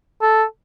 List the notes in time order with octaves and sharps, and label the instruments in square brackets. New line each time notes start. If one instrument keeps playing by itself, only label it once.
[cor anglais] A4